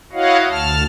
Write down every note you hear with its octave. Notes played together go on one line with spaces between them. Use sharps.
E4 F#4 C#5 D#5 F5 F#5
D2 A5 F6